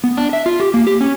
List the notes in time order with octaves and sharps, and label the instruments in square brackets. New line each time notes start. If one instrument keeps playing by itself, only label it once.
[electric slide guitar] B3
D4
E5
F4
G4
A#3
G4
C#4